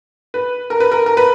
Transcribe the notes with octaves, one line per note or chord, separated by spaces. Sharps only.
B4
A#4
B4
A#4
A#4
B4